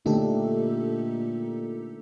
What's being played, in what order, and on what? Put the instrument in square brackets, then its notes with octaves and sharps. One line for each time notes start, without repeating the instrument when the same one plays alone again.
[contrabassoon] A#2 [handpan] D3 A3 D4 [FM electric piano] D#4 G4 A4